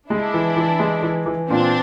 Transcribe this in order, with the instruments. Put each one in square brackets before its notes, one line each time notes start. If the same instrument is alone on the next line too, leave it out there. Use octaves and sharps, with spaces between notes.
[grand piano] G#3 [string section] D4 E4
[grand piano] E3
E3
G#3
E3
E3
[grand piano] A#2 [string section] C4 D4